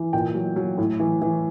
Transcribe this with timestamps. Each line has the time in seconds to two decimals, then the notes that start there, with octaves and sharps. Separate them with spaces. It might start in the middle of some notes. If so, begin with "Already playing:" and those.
Already playing: E3
0.13 A#2 G5
0.35 F#3
0.56 F#3
0.78 A2
1.00 E3
1.22 E3